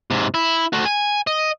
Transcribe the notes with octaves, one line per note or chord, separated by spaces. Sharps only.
G#2 C3
E4
A3 F#4
G#5
D#5